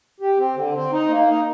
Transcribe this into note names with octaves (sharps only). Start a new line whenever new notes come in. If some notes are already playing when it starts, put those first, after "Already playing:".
G4
C4
D3
C4
D#4
A#3
D#4